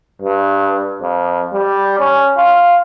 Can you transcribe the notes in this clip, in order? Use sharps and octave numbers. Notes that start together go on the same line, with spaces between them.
G2
F2
G3
C#4
F4